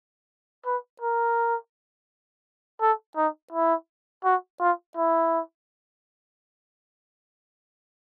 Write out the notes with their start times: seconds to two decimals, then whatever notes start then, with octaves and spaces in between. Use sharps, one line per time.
0.66 B4
1.01 A#4
2.81 A4
3.16 D#4
3.53 E4
4.24 F#4
4.61 F4
4.97 E4